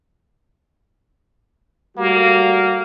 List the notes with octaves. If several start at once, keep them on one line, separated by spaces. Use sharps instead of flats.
G3 A3 A#3 F#4